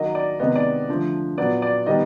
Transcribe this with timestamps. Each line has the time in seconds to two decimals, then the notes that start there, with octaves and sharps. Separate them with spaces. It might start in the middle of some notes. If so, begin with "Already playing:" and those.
Already playing: D#3 F#3 A#3 D#5
0.15 D5
0.40 C3 D#3 G#3 B3 D#5
0.55 D5
0.89 D3 F3 A3
1.38 A#2 F#3 B3 D5
1.62 D5
1.86 D#3 G3 B3 D#5